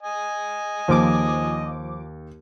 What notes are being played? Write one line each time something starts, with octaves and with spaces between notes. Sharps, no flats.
D#5 G#5
D#2 F3 D6